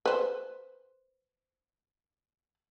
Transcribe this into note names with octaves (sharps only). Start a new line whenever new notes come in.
B4 C5